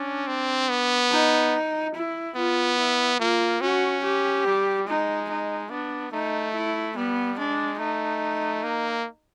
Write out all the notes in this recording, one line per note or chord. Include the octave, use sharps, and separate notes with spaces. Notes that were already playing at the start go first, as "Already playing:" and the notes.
Already playing: C#4 D4
C4
B3
D#4
E4
B3 F4
E4
A#3 F4
C#4 F#4
G4
G3
G#3 D#4
D#4
B3 D4
A3 D#4
E4
G3 B3
G#3 D4
A3 D#4
A#3